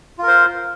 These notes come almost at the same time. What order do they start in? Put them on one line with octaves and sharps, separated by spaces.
F4 A#4 C5